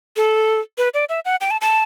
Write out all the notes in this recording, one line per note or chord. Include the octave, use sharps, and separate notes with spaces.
A4
B4
D5
E5
F#5
G5
A5
A5